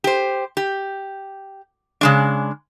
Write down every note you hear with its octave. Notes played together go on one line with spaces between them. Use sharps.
G4 C5
G4
C#3 G#3 D4